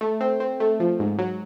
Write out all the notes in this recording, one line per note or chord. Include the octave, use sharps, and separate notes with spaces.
A3
C4
C4
A3
F3
G#2
F#3